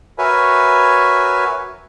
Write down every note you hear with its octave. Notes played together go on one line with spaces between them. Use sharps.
F#4 A#4 B4 C#5 E5 G#5